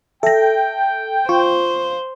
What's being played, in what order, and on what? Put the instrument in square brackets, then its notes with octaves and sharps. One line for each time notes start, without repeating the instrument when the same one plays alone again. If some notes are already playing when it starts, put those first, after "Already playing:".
[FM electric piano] A4 [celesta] E5 A#6 [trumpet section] G5
[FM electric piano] F4 [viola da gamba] C5 [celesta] C#6